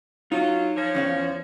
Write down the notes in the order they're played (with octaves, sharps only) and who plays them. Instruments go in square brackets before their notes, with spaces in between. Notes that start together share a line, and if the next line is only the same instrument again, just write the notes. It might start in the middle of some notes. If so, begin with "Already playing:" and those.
[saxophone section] F#3 F4 [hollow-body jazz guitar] D#4
[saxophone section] F3 C#5
[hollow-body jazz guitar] E2 C#4 F5